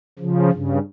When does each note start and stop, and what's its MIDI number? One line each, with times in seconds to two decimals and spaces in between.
0.19 0.51 49
0.19 0.51 53
0.52 0.79 43
0.52 0.79 49